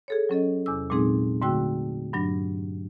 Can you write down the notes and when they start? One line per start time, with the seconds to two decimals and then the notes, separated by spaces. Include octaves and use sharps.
0.08 G#4 A4 C#5
0.29 F#3 C#4 A4 D#5
0.66 E2 C3 D6 E6
0.90 A#2 F#3 G#3 C4 D#4 G#4
1.42 G#2 D3 A3 F#4 G5 E6
2.13 G2 F#3 D4 A#6